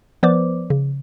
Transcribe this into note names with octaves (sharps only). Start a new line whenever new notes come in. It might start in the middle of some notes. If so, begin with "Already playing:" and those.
F3 B3 B4 C5 D5 D6
C#3